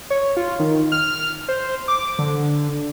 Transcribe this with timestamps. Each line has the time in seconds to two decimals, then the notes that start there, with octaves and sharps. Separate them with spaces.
0.10 C#5
0.37 F4
0.59 D#3
0.92 F6
1.49 C5
1.88 D6
2.19 D3